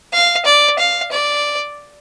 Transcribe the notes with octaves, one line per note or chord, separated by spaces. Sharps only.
F5
D5
F5
D5